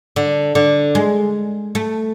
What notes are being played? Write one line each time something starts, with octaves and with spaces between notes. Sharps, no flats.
D3
D3
G#3
A3